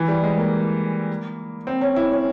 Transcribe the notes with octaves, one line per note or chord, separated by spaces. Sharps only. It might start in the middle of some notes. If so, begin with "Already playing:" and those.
Already playing: E3
G3
G#3
A#3
C4
C#4
E4
C#4